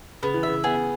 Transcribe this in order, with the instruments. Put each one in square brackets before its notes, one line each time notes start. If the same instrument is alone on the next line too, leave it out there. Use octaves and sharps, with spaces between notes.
[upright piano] C#3 [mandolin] B3
[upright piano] E3
[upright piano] C#3 [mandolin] E5
[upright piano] B3 [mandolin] G#4